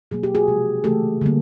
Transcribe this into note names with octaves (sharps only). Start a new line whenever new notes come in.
B2 F#3 A#3 G#4
G4
F#4 G#4
C3 F3 G#3
C#3 E3 A3 G4 A4
D3 G3 A#3